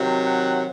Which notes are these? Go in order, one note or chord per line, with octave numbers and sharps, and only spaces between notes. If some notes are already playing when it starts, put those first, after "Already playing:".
Already playing: C3 D#3 F#3
F#5